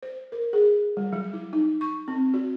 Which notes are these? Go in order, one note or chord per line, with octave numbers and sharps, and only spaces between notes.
C5
A#4
G#4
G3
F#3
E4
D#4
C#6
C4
F#4